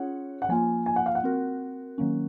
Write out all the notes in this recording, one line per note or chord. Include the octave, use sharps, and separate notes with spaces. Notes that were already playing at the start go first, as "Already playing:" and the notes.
Already playing: C#4 F4 G#4 C#5 F#5
F#5
F3 A#3 F4 G#5
G#5
F#5
F5
F#5
C4 F#4 A#4
D#3 F#3 A#3 C#4